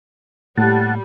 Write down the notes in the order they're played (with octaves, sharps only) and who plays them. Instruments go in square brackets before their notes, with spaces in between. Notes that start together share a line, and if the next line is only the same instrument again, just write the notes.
[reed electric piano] A2 [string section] G3 [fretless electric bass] A3 A#3 [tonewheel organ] F#5 A5